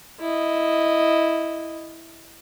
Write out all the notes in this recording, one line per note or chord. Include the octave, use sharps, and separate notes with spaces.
E4 D#5